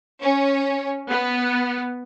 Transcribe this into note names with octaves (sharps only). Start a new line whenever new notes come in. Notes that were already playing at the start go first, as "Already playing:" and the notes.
C#4
B3